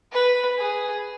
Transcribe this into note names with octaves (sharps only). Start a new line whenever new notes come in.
B4
G#4